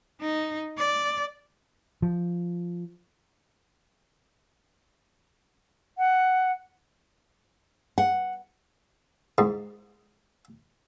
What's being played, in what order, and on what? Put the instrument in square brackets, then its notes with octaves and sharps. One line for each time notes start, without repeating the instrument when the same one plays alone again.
[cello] D#4
D5
[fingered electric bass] F3
[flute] F#5
[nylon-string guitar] F#5
[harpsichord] G#2